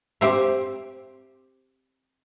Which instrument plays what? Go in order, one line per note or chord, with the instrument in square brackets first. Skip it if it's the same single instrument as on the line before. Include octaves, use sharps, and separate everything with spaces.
[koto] C4 G4 C5 E5